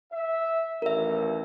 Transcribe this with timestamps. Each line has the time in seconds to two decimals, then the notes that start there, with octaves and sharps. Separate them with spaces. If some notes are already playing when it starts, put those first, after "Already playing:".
0.12 E5
0.82 A1 D#2 A#4 E5